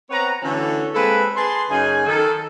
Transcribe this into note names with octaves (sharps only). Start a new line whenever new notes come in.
B3 C4 B4 C#5 F#5 A#5
D3 E3 A3 C#4 F#4 A4
G#3 A#3 C4 A4 B4
G#4 B4 A5 C6
F#2 C#3 D#4 G#4 G#5
D#3 A4